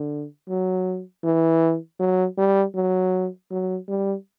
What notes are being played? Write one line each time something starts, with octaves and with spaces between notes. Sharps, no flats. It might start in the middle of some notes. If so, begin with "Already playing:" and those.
Already playing: D3
F#3
E3
F#3
G3
F#3
F#3
G3